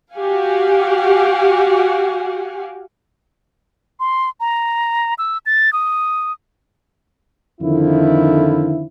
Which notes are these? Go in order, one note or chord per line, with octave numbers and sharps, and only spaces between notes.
F#4 G4 F5 F#5 G#5
C6
A#5
E6
A6
D#6
F2 D3 D#3 F3 E4